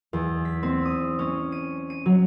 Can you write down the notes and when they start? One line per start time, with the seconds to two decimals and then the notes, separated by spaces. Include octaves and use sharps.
0.13 E2
0.45 B6
0.63 C4
0.85 D#6
1.19 C#4
1.52 D#7
1.90 D#7
2.06 F#3